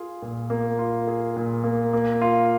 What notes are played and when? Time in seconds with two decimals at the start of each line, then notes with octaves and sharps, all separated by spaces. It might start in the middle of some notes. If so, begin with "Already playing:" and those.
Already playing: F4 G#4
0.22 A#2
0.50 A#3
0.79 F4
1.07 G#4
1.36 A#2
1.64 A#3
1.93 A#3
2.22 F4